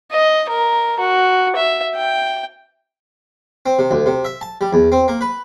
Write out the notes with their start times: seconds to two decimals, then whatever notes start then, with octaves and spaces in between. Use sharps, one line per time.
0.11 D#5
0.49 A#4
1.00 F#4
1.56 E5
1.96 G5
3.66 C4
3.79 C3
3.91 D2
4.06 C3
4.25 E5
4.41 A5
4.61 G3
4.73 E2
4.92 C4
5.08 A#3
5.21 B4